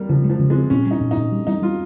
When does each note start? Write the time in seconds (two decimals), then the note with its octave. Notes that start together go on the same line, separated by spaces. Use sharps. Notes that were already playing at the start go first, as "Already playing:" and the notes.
Already playing: G3 A#3
0.09 C#3 F3
0.24 G#3
0.29 F3
0.39 C#3
0.50 G#3
0.55 C4
0.70 A#2 C#4
0.86 G3 D#4
1.01 A#2
1.11 D#4
1.17 A#2
1.32 G3
1.47 G3 D#4
1.62 G3 F4